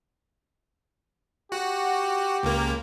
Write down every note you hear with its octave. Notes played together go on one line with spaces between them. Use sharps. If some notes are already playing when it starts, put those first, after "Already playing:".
F#4 G4
C#2 A#3